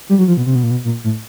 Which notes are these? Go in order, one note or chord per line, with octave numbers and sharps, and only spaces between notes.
G3
F#3
F3
B2
C3
B2
A#2
B2
A#2
A2